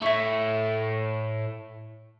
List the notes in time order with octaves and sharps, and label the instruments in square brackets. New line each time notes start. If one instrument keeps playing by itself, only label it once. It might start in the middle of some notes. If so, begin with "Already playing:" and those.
[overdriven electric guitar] A2 A3 [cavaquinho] E4 C#6